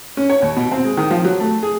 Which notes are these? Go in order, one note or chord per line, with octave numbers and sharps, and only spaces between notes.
C#4
C#5
D#2
B2
C4
G#3
D#3
F3
F#3
A3
G#4